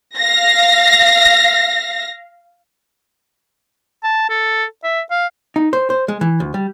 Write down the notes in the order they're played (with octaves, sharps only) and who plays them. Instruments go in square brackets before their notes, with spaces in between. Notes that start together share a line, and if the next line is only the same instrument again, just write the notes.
[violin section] F5 A#6
[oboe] A5
A4
E5
F5
[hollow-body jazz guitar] D#4
C5
C5
G#3
E3
D2
G3